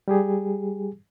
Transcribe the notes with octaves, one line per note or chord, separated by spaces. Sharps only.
G3 G4 G#4